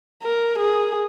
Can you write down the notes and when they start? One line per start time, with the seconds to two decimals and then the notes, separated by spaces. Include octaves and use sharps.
0.23 A#4
0.58 G#4